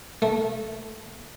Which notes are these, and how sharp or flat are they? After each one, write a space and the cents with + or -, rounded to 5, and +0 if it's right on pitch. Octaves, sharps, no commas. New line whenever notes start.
A3 -10